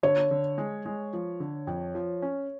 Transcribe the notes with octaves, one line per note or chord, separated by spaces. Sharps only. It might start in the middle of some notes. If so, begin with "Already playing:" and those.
D3 C#5
D3
G#3
G#3
F3
D3
F2
F3
C#4